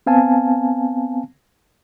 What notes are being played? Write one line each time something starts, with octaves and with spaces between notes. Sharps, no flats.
B3 C4 F5 G#5 A5